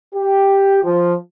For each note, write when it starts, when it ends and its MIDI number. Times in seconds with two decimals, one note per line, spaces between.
0.15 0.80 67
0.84 1.14 53